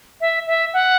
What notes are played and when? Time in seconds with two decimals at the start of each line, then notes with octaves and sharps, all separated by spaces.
0.21 E5
0.47 E5
0.73 F#5